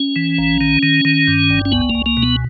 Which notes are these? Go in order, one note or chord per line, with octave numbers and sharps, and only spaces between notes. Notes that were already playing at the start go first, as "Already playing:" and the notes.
Already playing: C#4
E3
A#1
D#3
D#3
D#3
G2
G1
C#4
C#2 B3
A#3
C#2
A#3
B2
B3